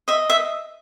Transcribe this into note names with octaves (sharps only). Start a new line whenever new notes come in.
D#5 E5
E5